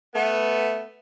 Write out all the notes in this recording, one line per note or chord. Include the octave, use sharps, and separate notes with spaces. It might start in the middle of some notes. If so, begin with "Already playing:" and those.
A3 B3